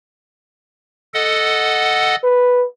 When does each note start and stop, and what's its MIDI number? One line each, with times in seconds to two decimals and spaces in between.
1.14 2.15 69
1.14 2.15 75
1.14 2.15 78
2.24 2.65 71